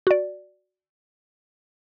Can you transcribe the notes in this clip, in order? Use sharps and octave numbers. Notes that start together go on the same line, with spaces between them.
F#4 D5